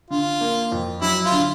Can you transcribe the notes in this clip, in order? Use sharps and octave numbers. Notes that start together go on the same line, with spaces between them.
D3 F4
A#3
F2
F#3 E4
F4
D3